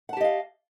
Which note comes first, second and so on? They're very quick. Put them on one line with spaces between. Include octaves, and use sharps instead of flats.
F#5 A5 G4 D#5 F5